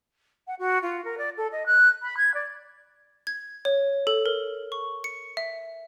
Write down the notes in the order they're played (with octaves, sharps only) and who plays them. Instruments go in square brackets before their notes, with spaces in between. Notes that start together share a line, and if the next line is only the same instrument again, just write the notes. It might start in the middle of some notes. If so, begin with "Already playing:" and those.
[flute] F#5
F#4
F4
A#4
D5
A4
D#5
F#6
B5
G#6
D5
[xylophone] G#6
C#5
A4
A#4
C#6
C#7
E5